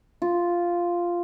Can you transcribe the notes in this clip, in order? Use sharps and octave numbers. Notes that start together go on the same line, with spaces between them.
F4